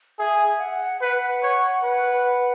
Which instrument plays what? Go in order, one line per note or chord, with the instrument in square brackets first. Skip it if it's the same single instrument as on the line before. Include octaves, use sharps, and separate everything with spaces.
[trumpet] G#4 [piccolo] E5
[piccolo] F#5
[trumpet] B4 [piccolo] F#5
[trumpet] C#5
B4